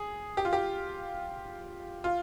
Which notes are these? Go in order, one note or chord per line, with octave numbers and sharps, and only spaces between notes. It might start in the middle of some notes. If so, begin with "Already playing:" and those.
Already playing: G#4
G4
F4
G4
F4